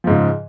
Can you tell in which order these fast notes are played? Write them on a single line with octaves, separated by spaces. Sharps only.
F3 G#2 C#3